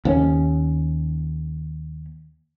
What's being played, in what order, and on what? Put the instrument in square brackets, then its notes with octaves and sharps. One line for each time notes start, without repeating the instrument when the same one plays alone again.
[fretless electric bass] D#2 B3 C#4